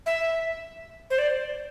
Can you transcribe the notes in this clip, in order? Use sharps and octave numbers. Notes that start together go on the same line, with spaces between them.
E5
C5
D5